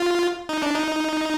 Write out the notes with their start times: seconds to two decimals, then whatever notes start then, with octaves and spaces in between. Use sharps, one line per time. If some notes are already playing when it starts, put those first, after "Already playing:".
Already playing: F4
0.49 D#4
0.62 D4
0.75 D#4